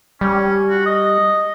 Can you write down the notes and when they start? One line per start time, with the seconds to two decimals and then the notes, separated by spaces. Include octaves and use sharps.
0.21 G3 C#4
0.70 F#4
0.86 D#5